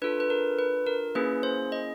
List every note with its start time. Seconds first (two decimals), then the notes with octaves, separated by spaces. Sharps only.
0.02 D4 F4 A4 B4
0.20 B4
0.30 A#4
0.59 B4
0.86 A#4
1.15 A#3 C#4 E4 G#4 B4
1.43 C5
1.72 D#5